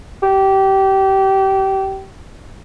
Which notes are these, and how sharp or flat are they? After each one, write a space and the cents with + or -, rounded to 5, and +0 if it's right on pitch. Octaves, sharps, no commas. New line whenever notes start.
G4 -25